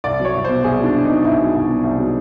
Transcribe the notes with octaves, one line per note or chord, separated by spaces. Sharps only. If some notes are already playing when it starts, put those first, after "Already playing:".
C2 D5
F#3
C#5
C2
B2 C5
C2 G#4
F#3 D4
C2
B2 D#4
C2 E4
F#3
C2
B2
C2
F#3